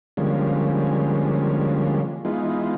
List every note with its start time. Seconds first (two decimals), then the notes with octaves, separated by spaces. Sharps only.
0.17 D3 F3 G3 G#3 A#3 C#4
2.25 E3 G#3 B3 D#4 F4